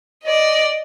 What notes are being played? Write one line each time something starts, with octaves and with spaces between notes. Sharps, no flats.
D5 D#5